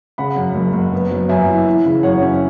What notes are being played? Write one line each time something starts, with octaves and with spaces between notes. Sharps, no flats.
C#3 F#5 B5
F#2
F#1
F#1
B3
F#3
F#2 E5 G#5
E4
E3
C#3
F#2 C#5 F#5
C#4